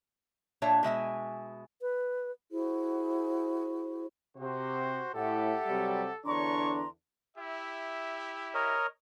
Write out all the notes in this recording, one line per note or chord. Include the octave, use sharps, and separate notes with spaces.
A#2 D4 C#5 E5 A5
B2 G#3 E5 G#5
B4
E4 F#4 G#4 C5
C3 F#4 C5
A2 G4 A4 E5 F#5
C3 F#3 G3
E2 D3 D4 C#5 A#5 C6 C#6
E4 G4 E5
A#4 C#5 D#5